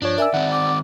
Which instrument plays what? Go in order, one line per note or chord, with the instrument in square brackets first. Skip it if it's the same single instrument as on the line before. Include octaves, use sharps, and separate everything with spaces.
[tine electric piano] G2 F4 C#5 [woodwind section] F3 [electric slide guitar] D4
[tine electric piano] A#4 G#5 E6 [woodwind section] D5 [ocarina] E5
[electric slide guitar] D#3 C4 [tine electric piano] F#5
[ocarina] D6